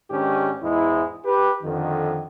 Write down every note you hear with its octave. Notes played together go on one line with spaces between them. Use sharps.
G#2 D#3 C#4 D4 G4
E2 G#2 G#3 E4
G4 B4
F2 D3 D#3